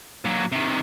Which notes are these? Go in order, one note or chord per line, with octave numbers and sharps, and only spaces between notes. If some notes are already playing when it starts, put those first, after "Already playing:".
A#2 F#3
C3 D#3